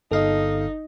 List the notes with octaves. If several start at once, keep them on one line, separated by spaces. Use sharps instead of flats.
G1 D#4 A4 D#5 F5